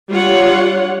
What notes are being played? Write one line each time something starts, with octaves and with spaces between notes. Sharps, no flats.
G3 D4 F4 C#5 F#5